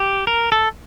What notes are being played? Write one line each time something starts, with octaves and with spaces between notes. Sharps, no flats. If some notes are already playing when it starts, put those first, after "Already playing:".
Already playing: G4
A#4
A4